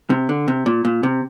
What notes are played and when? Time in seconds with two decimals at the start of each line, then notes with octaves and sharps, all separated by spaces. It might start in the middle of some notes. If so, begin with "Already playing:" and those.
0.10 C3
0.29 D3
0.48 C3
0.66 A#2
0.85 A#2
1.03 C3